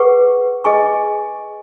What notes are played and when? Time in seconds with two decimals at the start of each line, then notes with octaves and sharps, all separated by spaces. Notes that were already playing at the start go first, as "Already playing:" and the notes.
Already playing: G#4 B4 F#5 C#6
0.64 G#4 D#5 G#5 C#6